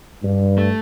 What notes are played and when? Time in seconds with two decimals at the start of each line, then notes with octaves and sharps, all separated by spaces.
0.23 G2
0.58 A3